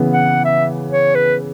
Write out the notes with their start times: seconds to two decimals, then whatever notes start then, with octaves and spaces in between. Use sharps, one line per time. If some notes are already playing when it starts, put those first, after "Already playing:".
Already playing: C#3 E3 B3
0.13 F#5
0.45 E5
0.92 C#5
1.15 B4